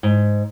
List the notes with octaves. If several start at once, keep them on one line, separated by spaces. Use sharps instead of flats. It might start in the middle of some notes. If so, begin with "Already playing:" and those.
G#2